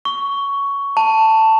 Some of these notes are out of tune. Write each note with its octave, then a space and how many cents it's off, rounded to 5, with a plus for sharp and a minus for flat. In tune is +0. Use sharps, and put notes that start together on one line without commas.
C#6 +10
A5 +10